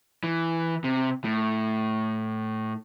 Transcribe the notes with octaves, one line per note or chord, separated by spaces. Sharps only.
E3
C3
A2